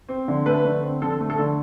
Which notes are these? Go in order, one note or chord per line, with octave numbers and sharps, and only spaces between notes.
C4
D3
A3 B4
D3
C4
D3 A4
A3
A4
D3